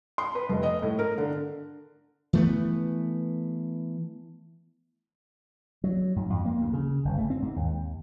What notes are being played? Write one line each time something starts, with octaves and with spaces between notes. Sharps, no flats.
C6
B4
F1
D#5
A2
A#4
D3
E3 A3 B3
F#3
G#2
F2
A#3
D2
C#3
G1
A3
C4
G#2
D#2